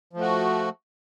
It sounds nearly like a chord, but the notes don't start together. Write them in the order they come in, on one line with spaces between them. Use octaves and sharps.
F3 A3 F#4